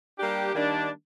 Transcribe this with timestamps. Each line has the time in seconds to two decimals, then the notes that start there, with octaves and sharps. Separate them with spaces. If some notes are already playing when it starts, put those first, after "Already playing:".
0.18 G3 A#3 D4 G4
0.54 D#3 G3 A#3 D4